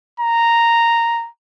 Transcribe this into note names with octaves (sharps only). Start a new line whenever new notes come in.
A#5